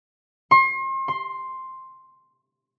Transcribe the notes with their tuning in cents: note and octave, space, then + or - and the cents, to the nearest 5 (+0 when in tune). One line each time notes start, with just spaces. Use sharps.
C6 +40
C6 +5